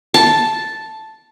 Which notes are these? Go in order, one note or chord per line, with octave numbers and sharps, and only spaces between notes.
A5